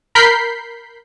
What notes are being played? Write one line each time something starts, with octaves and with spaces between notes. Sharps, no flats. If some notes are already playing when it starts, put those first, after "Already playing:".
A#4 B5 G6 B6 C7